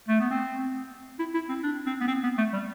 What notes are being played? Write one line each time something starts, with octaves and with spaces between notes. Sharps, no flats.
A3
B3
C4
E4
E4
C4
D4
C4
B3
C4
B3
A3
G3